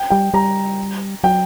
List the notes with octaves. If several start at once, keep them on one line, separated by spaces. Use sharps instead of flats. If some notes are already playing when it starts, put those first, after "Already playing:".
Already playing: G5
G3 G5
G3 A#5
F#3 G5